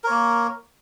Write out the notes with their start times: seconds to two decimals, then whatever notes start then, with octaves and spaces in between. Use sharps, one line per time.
0.04 A#4
0.07 C#5
0.10 A#3